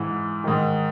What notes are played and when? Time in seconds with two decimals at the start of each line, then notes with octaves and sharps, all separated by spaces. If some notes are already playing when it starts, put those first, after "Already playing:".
Already playing: G#2 E3
0.44 G#2 D#3 D#4